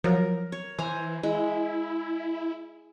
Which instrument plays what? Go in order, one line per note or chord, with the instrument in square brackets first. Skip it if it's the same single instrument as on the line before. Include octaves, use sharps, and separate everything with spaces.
[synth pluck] F3 F#3 [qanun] A#4
[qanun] C#5
[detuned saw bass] E3 [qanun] C5 G#5 A#5
[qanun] G#3 [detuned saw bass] E4